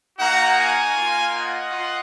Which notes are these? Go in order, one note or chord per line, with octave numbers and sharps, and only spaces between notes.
A#3 D#4 F#4 F#5 A#5
F5 G#5
A#3 F4
D#5 F#5
F4